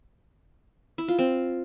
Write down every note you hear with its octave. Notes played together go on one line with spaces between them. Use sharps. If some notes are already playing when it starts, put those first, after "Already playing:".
E4
F4
C4